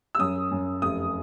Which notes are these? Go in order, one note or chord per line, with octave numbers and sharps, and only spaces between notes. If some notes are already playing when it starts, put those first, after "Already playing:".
E6
F#2 D#6
F#2
F1 D#6